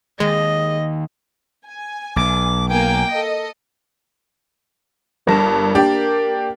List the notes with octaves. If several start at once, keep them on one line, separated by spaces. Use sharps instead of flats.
D#2 G#3 D#5
G#5
B1 D6
A#3 G5 G#5 D6
A4 D#5
G1 G2 A#4 A5
A#3 D4 G4